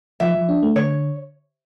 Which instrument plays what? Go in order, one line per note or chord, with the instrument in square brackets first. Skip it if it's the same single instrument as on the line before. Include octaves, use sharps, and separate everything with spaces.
[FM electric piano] F3 [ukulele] E5
[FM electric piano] F3
D4
A3
[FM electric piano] D3 [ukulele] C#5